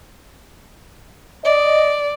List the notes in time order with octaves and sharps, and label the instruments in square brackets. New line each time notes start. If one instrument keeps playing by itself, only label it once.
[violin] D5 [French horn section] D#5